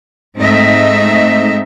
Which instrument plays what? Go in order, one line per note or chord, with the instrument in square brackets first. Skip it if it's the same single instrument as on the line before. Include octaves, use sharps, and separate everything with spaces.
[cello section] G#2 A3 C4 D#4 D#5 E5